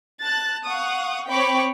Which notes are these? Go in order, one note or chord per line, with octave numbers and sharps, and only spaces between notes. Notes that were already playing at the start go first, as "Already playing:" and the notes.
A5 F#6 A6
F5 F#5 C#6 D#6
C4 C#5 G5 B5 C#6 D6